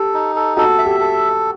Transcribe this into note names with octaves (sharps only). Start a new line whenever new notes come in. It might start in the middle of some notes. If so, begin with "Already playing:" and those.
Already playing: G4 A4
D#4
A4
F#4 A4
E5
G4
A4